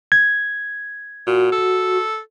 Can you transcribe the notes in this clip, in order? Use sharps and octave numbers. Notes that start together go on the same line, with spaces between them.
G#6
A#2 F#4
A4